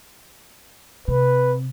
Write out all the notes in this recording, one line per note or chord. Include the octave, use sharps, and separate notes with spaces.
C3 B4